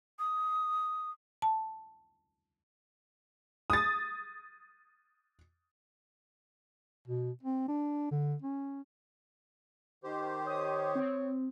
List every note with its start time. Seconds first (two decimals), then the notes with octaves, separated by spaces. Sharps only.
0.19 D#6
1.42 A5
3.70 D#6 A6
7.08 B2
7.43 C4
7.68 D4
8.11 D3
8.42 C#4
10.04 D#3 G4 C5
10.47 C#5 D#6
10.95 C4